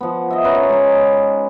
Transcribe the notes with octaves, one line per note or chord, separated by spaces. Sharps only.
F3 B3
D#5 E5
C#4 B4 C#5 A#5
G#3 D#4